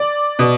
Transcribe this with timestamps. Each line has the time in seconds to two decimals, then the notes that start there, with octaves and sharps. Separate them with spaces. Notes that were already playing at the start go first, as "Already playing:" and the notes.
Already playing: D5
0.39 B2